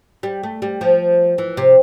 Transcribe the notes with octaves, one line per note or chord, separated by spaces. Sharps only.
G3
A3
G3
F3
E3
C3